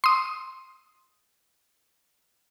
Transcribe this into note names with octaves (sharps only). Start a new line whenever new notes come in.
C6 D#6